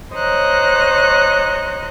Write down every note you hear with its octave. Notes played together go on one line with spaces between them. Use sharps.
C5 C#5 D#5 A#5 F#6